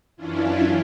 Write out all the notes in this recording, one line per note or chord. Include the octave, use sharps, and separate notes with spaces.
F#2 E3 C#4 D4 E4 F4